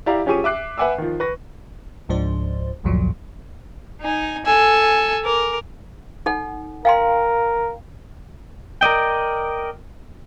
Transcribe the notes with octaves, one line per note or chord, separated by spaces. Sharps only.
E4 G4 D5 F5 A#5
F3 C#4 G4 G#4 C#6 D#7
E5 D6 F#6 C7
B4 E5 F#5 G#5 D6 E6
D#3 F3
B4 C#6 A#6
C#2 G#2 F3 D4 C5
A1 D2 G2 A#2 F3 F#3
D#4 G#5
A4 G#5 E6
A#4 D6
D#4 A4 F#5
A#4 F5 G5 C6
A#4 D5 D#5 G5